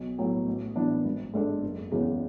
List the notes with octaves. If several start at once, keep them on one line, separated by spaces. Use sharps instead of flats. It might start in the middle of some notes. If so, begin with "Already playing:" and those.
Already playing: B1
A2 F#3 B3
A1
A2 E3 B3 D4
G#1
G#2 G#3 D4 A4
F#1
E2 C#3 E3 G#3